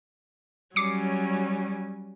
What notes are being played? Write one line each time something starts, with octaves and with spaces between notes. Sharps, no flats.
F#3 G3 C#4 D6 C7 C#7